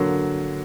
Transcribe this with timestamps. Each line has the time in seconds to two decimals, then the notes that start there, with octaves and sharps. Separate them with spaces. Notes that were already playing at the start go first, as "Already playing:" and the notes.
Already playing: D3 F#3 A#3